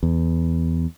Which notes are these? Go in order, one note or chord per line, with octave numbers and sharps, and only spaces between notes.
E2